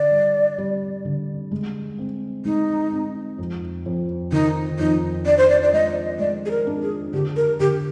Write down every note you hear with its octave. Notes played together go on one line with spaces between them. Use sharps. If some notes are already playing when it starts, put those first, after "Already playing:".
Already playing: D3 D5
G3
G3
D3
G#3
C4
G#3 D#4
C4
F2
F2
D#3 D#4
F2 D#4
D4 D5
C5
D5
D5
G#3 D#5
G#3 D5
G#4
A#4
D4
G#4
D3 G4
A#4
D3 G4